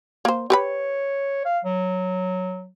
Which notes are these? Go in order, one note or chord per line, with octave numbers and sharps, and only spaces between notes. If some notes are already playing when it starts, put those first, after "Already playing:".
A#3 C5
G4 B4 C#5 B5
F5
F#3